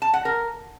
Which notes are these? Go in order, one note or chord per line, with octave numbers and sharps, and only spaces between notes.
A5
F#5
A#4